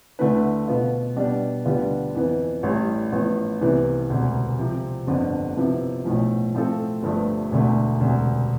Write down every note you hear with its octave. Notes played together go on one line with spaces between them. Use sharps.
D2 D3 A3 E4 B4
B2 B3 F4
B2 G3 D4
D2 D3 G3 B3 F4
F2 E3 B3
A1 A2 G3
A1 A2 F3 B3
C2 C3 E3 B3
E1 D2 C3
C3 F3 C4
G1 F2 D3 F3
F2 C3 F3 B3 E4
B1 A2 F3
A2 F3 C4 F4 A4
G1 G2 F3 A3
E1 D2 D3 A3
E1 D2 C3